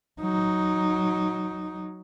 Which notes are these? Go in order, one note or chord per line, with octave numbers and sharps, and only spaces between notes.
F#3 D#4